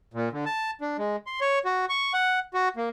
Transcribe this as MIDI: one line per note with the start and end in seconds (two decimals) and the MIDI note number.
0.14 0.29 46
0.32 0.45 50
0.46 0.71 81
0.81 0.97 62
0.98 1.16 56
1.27 1.40 84
1.41 1.59 73
1.65 1.85 66
1.89 2.13 85
2.14 2.39 78
2.54 2.69 66
2.77 2.89 58